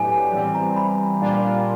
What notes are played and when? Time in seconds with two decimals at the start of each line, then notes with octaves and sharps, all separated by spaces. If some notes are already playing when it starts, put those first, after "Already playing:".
Already playing: A2 F#3 B3 D4 G4 G#5
0.33 E3 G3 C4
0.55 A#5
0.77 B5
1.21 A#2 G3 A#3 D4 F4